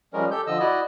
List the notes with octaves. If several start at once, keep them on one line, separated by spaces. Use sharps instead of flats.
F3 G3 G#3 C#4 A#4
G4 A4 G6
D3 F3 D#5 E6
E4 F#4 D5 D#5